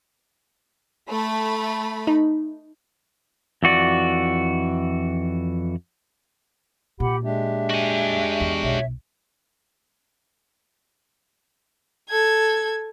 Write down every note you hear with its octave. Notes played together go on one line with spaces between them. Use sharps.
A3 B5
D#4
F2 E3 F#4 D5
A#2 G4 F#5 B5
G#3 D4 G4 E5
F#4 G#5
E2
B1 C#5 E5
A4 G#6